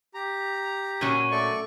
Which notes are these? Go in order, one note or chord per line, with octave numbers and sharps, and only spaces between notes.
G4 A#5
A#2 F#3 C#4
A3 D5 C#6